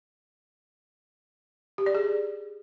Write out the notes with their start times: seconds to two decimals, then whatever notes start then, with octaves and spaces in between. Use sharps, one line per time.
1.78 G4
1.86 D5
1.95 G#4